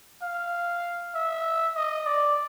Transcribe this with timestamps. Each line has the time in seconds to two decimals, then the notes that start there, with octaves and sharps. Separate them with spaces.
0.22 F5
1.15 E5
1.75 D#5
2.06 D5